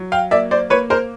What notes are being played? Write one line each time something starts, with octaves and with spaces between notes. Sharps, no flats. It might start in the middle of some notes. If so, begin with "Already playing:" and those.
Already playing: F#3
F5 G5
A#3 D5 E5
C5 D5
A#3 B4 C#5
A#4 C5